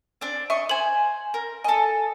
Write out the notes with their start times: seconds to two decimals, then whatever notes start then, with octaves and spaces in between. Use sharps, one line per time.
0.21 C4 D4
0.50 D#5 E5 C#6
0.69 C5 G#5 F#7
1.34 A#4
1.64 A4 D#5 G#5 A5